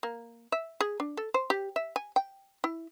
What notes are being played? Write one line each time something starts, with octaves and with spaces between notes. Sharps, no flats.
A#3
E5
G#4
D4
A4
C5
G4
E5
G#5
G5
E4